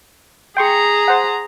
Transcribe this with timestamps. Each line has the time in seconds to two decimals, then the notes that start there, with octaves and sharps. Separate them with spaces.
0.57 G#4 G5 A#5 C6 C#6
1.08 C5 F#5